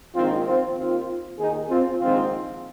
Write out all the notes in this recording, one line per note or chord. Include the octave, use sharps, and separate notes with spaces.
A#1 G#2 D#3 C4 F4
C4 F4
D#2 D#3 C4 F4
D#2 D#3 D#4 G#4
C4 F4
A#1 G#2 D#3 C4 F4